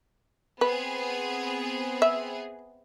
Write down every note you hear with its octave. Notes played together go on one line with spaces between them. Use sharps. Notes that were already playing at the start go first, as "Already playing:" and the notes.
B3 C4 G#4 B4
E5